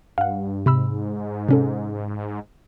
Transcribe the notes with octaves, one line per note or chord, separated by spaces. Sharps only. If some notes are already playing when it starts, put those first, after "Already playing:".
G2 F5 F#5
G#2 C3 B5 E6
C3 C#4 A4